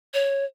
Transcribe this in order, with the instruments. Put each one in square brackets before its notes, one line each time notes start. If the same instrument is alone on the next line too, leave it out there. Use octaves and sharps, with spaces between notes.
[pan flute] C#5